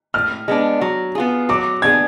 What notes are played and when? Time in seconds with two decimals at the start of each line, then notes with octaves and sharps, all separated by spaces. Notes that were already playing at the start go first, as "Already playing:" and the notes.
0.14 A2 F6
0.48 G#3 B3 D4
0.81 F#3
1.15 B3 F4 G#4
1.49 F#3 D6
1.82 B3 D4 F4 G#4 G#6